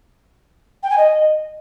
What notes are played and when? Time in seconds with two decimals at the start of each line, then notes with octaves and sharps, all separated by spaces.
0.83 G5
0.90 G#5
0.98 D#5